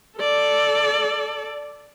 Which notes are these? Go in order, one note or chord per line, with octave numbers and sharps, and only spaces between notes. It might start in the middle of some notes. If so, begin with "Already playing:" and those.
A4 D5